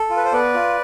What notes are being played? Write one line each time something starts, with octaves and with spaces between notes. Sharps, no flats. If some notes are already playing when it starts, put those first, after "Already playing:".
Already playing: A4
F4
B4
C5
B3 B4 D5
F4